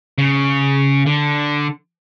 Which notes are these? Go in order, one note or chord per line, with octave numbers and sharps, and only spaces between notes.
C#3
D3